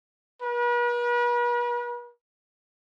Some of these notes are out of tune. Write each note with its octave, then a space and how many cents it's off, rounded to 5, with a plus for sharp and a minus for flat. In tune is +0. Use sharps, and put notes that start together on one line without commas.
B4 -45